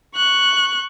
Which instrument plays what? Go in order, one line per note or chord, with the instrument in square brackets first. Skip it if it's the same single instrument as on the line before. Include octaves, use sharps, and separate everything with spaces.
[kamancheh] C#6 F#6